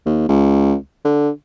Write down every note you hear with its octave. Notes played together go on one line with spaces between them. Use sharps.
D#2
C#2
D3